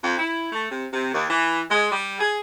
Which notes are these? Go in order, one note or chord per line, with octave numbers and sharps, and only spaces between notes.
F2
E4
A3
C3
C3
D#2
E3
G#3
G3
G#4